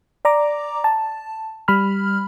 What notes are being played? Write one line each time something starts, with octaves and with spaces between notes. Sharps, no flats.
D5 A#5 D6
A5
G3 B5 F6